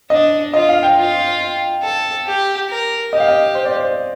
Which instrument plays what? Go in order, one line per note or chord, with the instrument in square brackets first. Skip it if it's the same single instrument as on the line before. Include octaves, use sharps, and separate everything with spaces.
[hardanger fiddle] D4 [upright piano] D#5
[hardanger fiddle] F4 [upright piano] D#5
[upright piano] F5
G5
[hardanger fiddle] F4
[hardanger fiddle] A4 [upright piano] A5
[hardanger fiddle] G4
A#4
[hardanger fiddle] G4 [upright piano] D#5
[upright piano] F5
D#5
C5
D5
C5